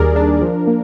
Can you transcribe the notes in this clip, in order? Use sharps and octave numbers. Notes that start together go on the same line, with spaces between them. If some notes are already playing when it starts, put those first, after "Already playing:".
Already playing: D#2 D#3 G3 G#4 A#4 D5
D4
F3
A#3